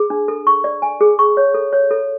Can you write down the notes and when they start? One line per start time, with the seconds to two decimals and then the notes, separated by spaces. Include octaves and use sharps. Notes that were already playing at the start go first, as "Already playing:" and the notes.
Already playing: G#4
0.10 D4
0.28 A4
0.47 C#6
0.64 D5
0.82 G#5
1.01 G#4
1.19 C#6
1.37 C#5
1.54 A4
1.73 C#5
1.91 A4